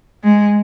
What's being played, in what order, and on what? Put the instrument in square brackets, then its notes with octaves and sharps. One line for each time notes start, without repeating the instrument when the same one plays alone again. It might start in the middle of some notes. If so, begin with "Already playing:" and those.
[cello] G#3